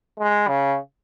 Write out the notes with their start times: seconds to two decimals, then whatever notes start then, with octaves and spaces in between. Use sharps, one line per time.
0.19 G#3
0.48 C#3